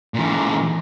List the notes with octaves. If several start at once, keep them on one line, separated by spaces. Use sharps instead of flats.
A#2 E3